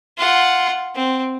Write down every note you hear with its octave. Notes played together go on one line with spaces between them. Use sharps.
F4 F#5
C4